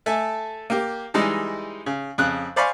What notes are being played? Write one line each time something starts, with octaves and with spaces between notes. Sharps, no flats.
A3 A4 E5 G#5
A#3 G4
E3 G3 G#3 D#4
C#3
F2 C#3 F#6
C5 D5 F5 G#5 B5 C#6